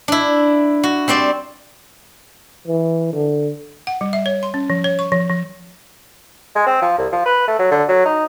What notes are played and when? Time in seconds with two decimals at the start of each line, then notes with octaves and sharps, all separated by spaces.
0.08 D4 E4
0.84 F#4
1.08 G3 C4 C5 D5
2.67 E3
3.13 D3
3.87 F#5
4.01 G3
4.13 E5
4.26 C#5
4.43 C6
4.54 C#4
4.70 F3
4.84 C#5
4.99 C#6
5.12 F3
5.29 F3
6.56 G#3
6.67 C4
6.82 F3
6.98 C2
7.13 F3
7.26 B4
7.48 A3
7.59 F#3
7.71 D3
7.89 F#3
8.05 D#4